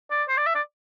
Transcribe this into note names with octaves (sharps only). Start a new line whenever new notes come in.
D5
C5
D5
E5
D5